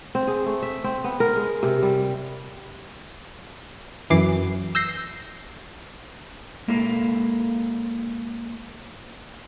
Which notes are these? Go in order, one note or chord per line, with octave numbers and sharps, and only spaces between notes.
C4
G#4
A3
E5
C4
B3
A#4
G#3
C3
G3
F#2 E3 D6 C7
E6 G6 A#6 C7
G#3 A#3 E4 A4 A#4 F5